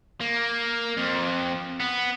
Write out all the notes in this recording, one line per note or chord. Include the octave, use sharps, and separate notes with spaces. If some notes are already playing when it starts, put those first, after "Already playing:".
A#3
F2
B3